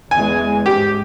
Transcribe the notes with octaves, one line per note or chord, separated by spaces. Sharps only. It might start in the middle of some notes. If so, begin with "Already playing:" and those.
E2 E3 G#3 G#5
G#2 G4